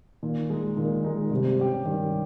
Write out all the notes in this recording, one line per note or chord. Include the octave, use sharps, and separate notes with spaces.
A#2 D#3
G#3 D#4
A#2 D#3
G#3 D#4
G2 C3
G3 C#4 G4
G2 D#3